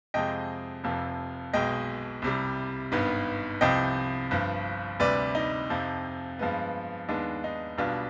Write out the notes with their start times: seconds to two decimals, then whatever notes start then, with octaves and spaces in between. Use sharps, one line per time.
0.14 F2 C3 F3 G#3 D#5 G5
0.84 F1 F2 C3 F3
1.53 B1 B2 G#3 D#5 G5
2.22 C2 C3 G3
2.92 G#1 G2 D#3 B3
3.61 C2 C3 F3 D#5 G5
4.31 G1 G2 F3
5.00 D2 C3 G3 B4 D5
5.35 D#4
5.70 F2 C3 F3
6.39 G2 F3 G#3 B3
7.09 D#2 D#3 G#3 B3 D4
7.44 D#4
7.78 B1 B2 G3 B3 D4 F4